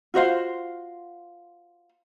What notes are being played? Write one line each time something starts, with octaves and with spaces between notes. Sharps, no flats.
F4 F#4 C5 F5